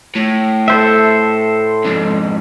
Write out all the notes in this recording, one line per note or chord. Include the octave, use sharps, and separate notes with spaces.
A2
A4 C5 E5
F2 G#2